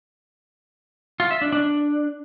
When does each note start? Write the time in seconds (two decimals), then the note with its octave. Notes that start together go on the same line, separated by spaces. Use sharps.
1.20 F4
1.31 E5
1.42 D4
1.52 D4